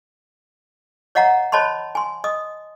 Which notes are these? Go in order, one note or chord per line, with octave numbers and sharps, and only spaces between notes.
C#5 D#5 F5 F#5 A#5
C5 C#5 D#5 A5 B5 C6
G#5 C6
D#5 D#6